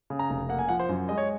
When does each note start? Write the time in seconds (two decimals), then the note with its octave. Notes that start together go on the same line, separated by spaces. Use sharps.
0.10 C#3
0.19 A#5
0.30 F1
0.49 A#3 F#5
0.59 G#5
0.69 F3 F#5
0.79 C5
0.89 F#2
1.09 G#3 D#5
1.18 C#5